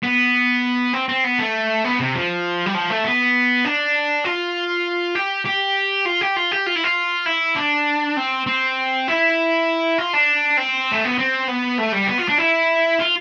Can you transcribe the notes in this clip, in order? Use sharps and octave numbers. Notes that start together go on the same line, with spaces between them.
B3
C4
C4
B3
A3
B3
C3
F3
G3
F3
A3
B3
D4
F4
G4
G4
F4
G4
F4
G4
F4
E4
F4
E4
D4
C4
C4
E4
F4
D4
C4
A3
B3
C4
B3
A3
G3
B3
F4
D4
E4
F4